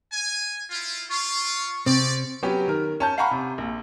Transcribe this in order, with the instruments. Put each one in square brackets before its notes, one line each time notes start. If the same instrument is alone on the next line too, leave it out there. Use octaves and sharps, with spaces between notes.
[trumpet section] G#5
E4 F4
[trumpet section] F4 [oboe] C#6
[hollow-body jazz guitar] C3 C4 [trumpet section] C#4 D5
[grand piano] F#3 B3 C#4 G4
D#3 A#4
C#4 A5 G6
F5 F#5 G#5 A#5 B5 C#6
C3
A#1